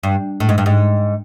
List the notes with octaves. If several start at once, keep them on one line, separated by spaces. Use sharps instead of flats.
G2
A2
G#2
G2
G#2